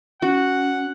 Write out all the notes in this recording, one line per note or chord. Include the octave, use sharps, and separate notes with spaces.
C#4 F#4 F#5